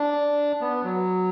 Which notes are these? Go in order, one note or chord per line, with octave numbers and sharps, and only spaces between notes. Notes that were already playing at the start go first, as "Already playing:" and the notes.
Already playing: D4
B3
F#3